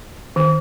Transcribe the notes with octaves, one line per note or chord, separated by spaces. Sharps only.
D#3